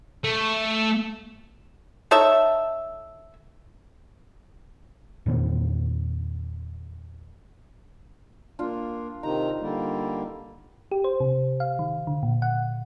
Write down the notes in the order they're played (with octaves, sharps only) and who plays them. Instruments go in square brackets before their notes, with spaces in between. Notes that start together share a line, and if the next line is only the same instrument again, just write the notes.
[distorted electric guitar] A3
[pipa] D#4 A4 C#5 E5
[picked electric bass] E2 A#2 D#3 C4
[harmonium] A#3 [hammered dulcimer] D4 F4
[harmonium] C3 D#3 A#5 [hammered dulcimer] D#4
[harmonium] D3 G3 A#3
[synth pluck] G4
C5
C3
F5
D#3
D3
A#2
F#5